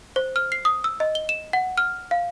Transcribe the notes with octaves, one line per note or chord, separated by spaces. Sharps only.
C5
F6
C7
D#6
E6
D#5
G7
E7
F#5
F6
F5